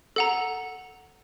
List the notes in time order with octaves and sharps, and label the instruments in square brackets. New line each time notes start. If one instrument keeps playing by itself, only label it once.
[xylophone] A4 F#5 A#5